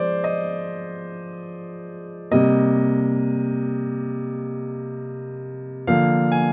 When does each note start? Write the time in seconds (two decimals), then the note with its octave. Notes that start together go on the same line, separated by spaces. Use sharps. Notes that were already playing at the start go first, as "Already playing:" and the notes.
Already playing: F3 G#3 C5 D5
0.24 D#5
2.31 C3 G3 A#3 D#5
5.87 D3 F3 A#3 F5
6.32 G#5